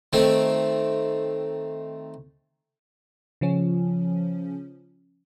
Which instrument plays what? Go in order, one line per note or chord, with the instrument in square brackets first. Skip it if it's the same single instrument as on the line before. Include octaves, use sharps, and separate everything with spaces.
[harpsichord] D#3 A3 C4
[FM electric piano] C#3 F3 C#4